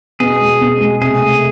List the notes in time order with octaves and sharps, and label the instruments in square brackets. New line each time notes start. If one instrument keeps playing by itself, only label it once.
[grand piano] B2 [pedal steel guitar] G#4
[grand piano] G#3
B2
G#3
[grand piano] C3 [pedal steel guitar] G#4
[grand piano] A3